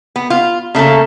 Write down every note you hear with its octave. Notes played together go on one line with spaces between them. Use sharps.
B3
F4
C#3 A3 A#3 A4